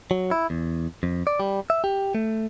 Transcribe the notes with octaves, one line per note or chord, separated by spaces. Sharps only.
F#3
E4
E2
F2
D5
G3
E5
G4
A3